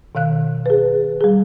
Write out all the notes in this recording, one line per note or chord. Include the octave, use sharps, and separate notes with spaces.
B2 D#3 F5 F#6
G#4 B4
G3 G#4